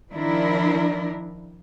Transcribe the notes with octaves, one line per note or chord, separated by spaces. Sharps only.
D#3 F3 D4 E4 A#4